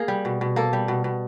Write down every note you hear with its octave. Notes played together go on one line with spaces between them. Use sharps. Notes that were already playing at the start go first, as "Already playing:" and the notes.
Already playing: A#3 G#4
G3
B2
B2
A#3 A4
G3
B2
B2